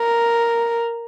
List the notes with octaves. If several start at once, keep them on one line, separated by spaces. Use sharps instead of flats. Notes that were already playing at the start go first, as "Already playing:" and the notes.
Already playing: A#4